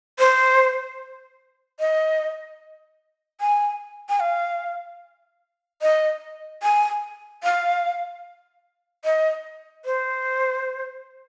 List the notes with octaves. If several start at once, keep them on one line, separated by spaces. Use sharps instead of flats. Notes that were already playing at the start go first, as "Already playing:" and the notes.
C5
D#5
G#5
G#5
F5
D#5
G#5
F5
D#5
C5